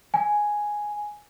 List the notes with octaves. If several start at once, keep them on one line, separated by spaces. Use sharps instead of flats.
G#5